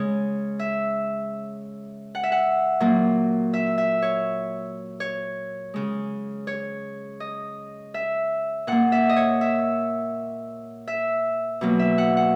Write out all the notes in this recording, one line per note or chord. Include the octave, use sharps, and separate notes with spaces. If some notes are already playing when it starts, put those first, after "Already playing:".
Already playing: C#3 G#3 C#5
E5
F#5
E5
F#5
A#2 F#3 A#3
E5
E5
C#5
C#5
C#3 G#3
C#5
D#5
E5
A#2 A#3 F#5
E5
D#5
C#5
E5
E5
B2 F#3 A#3
E5
F#5
F#5